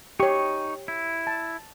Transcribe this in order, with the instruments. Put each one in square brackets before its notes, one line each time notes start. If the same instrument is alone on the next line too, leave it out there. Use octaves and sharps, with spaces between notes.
[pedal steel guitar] D#4 C#6 [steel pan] G4 C#5
[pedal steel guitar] E4
[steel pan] A5